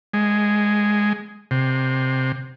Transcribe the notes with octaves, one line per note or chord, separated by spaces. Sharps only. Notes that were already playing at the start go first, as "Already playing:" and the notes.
G#3
C3